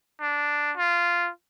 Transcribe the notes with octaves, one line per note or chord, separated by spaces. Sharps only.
D4
F4